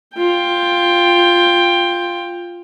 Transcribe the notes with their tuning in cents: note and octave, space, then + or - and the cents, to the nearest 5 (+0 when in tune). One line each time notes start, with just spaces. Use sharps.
F4 +0 G5 +15